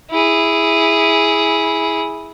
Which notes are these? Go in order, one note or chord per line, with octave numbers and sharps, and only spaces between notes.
E4 G#4